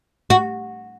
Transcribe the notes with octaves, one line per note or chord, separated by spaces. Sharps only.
F#4